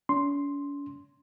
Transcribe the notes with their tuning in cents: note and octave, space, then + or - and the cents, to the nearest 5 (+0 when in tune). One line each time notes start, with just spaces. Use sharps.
C#4 +45 C6 +0